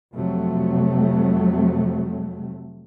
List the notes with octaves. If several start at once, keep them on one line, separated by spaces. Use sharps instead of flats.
F2 C3 F#3 A3